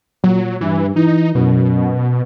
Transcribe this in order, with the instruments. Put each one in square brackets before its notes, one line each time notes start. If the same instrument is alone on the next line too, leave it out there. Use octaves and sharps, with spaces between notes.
[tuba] A#2 [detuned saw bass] F#3
[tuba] G2 [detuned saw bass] E3
[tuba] E3 [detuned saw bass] D#4
[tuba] F#2 [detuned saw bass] B2